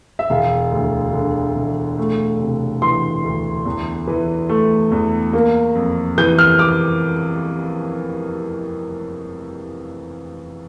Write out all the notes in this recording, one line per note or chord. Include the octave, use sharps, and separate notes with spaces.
E5
E1 F5
D2
D3
E1
A3
C3
E3 C6
D2
E2
E3
A3
E2
A#3
F2
E3 G6
F6
D6